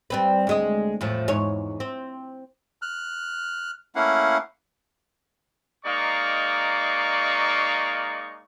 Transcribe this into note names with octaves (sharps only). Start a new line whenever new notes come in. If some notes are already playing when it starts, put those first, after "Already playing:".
G3 C4 B4
D2 G#3 D#5
E2 A2 F3
E2 G#2 C#5
C4
F6 F#6
A3 A#3 C#4 E4 F5 F#5
G#3 A#3 D#4 D5 F5 C#6